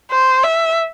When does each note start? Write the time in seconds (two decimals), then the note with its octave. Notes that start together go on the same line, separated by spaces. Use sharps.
0.11 C5
0.44 E5